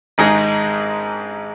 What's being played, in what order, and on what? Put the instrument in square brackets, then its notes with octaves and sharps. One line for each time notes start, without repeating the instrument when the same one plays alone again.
[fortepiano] G#1 G#2 G#3 D#4 G#4